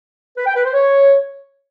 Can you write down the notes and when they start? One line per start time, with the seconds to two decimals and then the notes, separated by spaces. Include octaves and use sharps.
0.38 B4
0.47 G5
0.56 B4
0.65 C5
0.74 C#5